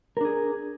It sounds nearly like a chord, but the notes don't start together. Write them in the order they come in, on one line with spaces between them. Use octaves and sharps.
A#4 D4 G#4